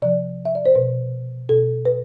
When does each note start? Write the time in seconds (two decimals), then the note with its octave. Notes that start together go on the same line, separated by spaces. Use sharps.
0.02 C3 F3 D5
0.45 E5
0.55 D5
0.66 C5
0.75 B2 B4
1.49 B2 A4
1.85 B4